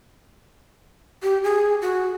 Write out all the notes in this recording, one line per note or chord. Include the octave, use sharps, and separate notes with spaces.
G4
G#4
F#4